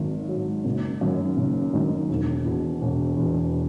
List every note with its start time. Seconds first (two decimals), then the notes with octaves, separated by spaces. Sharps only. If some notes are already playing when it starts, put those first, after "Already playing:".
Already playing: G#1 G#2 F#3
0.29 G#2 F#3
0.65 F#1
1.01 F#2 D#3
1.37 F#1
1.73 F#2 D#3
2.10 E1
2.45 E2 B2
2.82 E1
3.17 E2 B2